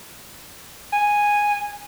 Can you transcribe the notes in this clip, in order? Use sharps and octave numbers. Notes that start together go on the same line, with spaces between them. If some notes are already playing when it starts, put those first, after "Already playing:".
G#5